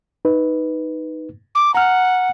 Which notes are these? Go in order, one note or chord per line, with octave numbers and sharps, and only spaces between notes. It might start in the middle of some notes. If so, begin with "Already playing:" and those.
D#4 B4
D6
F#5 A#5 F6